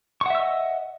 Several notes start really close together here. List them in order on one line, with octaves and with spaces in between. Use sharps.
C#6 F#5 E5 E6 D#5